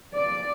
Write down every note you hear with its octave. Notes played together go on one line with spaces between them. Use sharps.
D5